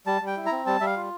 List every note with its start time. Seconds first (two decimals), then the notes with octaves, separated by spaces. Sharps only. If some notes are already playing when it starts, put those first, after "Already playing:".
0.07 G3 A5
0.21 G3
0.27 G5
0.37 E4
0.46 A#5
0.52 C4
0.67 G3 A5
0.81 G3 E5
0.86 F5
0.96 F4